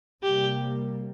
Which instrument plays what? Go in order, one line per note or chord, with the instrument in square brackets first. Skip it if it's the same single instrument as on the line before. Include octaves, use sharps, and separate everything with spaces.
[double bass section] C3 G3 A#3 [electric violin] G4